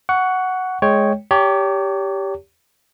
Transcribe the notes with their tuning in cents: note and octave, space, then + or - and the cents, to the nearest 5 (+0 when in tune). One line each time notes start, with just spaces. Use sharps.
F#5 +0 C#6 +20
G#3 +10 C#5 +0 G5 +0
G4 +0 C#5 +35 A5 +45